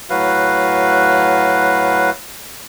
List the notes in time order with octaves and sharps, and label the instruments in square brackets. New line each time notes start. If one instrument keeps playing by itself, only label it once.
[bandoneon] A2 F#3 F#4 B4 F5